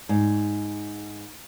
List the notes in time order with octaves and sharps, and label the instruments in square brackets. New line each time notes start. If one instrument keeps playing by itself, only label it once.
[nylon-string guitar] G#2